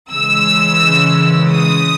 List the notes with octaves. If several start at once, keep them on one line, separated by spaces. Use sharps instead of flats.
C#3 E3 G#3 E6
D#6